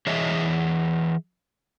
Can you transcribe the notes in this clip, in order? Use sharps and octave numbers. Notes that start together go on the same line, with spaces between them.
E3 G#4 C#5 D#5 E5